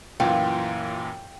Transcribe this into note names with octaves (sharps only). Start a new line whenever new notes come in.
F#2 A#2 E3 F4 G5